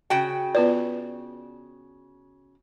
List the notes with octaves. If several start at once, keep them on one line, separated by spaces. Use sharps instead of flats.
C#3 F#4 G5
B3 F4 B4 D5